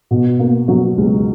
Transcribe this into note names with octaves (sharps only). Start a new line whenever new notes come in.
B2
A#3
F#3
C#2